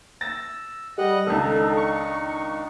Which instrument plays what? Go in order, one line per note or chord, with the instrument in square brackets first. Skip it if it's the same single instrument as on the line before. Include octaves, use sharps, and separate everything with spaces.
[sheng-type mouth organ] E6 [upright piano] A6 A#6
[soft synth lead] G3 [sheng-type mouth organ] D#5 F#5
[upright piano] C#2 D#3 [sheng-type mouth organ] D4 D#4 [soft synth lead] A4
[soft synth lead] C#6